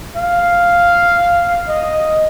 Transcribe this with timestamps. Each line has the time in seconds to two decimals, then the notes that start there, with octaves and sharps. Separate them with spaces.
0.16 F5
1.68 D#5